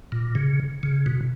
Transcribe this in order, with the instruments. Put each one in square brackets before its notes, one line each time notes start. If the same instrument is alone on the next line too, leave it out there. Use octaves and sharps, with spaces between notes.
[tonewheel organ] A#2
C#3
C#3
B2